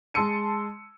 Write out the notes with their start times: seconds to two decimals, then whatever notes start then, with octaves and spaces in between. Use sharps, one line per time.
0.14 G#3 A5 C6 E6 C#7 D#7